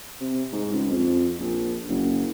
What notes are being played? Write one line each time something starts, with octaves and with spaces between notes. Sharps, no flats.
C3
G#2
C#2
F2
A#1
F#1